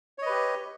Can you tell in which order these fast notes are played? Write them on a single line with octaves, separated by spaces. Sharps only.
C#5 D#5 B4 G4